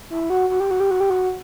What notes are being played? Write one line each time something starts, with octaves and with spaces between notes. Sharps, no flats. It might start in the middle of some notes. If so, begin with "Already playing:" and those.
E4
F#4
F#4
G4
F#4
G4
F#4
G4
F#4